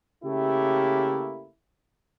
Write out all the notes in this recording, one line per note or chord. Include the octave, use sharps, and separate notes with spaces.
C#3 A3 A#3 E4 G4